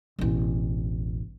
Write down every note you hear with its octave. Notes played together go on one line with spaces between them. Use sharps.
E1 A1